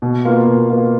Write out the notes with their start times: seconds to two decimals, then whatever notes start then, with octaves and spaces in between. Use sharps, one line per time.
0.02 B2
0.25 A#3 F4 B4
0.47 B2
0.70 A#3 F4 B4